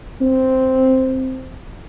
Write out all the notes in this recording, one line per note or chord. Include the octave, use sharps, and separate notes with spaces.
C4